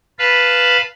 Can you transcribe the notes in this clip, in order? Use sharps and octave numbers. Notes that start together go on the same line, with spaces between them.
B4 F5 A5 B5